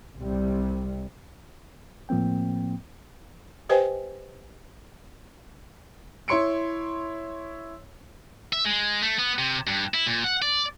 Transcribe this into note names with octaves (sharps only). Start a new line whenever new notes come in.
C2 C3 G3
A2 F3 A#3 C4 G5
G4 B4 C5 D#5 G5 G#5
E4 C#5 C6 C#7 D7
E5
G#3
A3
B3
C3
G2
E4
A#2
F#5
D5